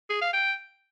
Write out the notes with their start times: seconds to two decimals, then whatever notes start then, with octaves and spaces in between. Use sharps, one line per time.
0.10 G#4
0.22 F5
0.33 G5